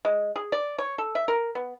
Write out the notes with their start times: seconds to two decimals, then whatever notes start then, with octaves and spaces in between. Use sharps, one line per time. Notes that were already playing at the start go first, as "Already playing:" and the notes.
0.05 G#3
0.36 G#4
0.52 D5
0.78 C#5
0.98 A4
1.15 E5
1.28 A#4
1.55 B3